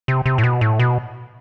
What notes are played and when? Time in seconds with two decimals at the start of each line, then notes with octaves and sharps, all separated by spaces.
0.08 C3
0.26 C3
0.38 A2
0.44 B2
0.61 A2
0.80 B2